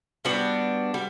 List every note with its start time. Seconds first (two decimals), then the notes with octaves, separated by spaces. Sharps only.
0.25 G3 B3 D4 F#4
0.94 G3